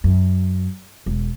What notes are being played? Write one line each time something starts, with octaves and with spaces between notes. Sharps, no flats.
F#2
E1